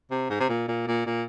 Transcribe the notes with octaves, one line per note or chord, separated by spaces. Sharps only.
C3
G#2
C3
A#2
A#2
A#2
A#2